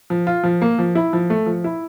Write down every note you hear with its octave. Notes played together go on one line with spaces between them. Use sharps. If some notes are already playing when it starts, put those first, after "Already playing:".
F3
F4
F3
A#3
F3
E4
F3
A3
F3
E4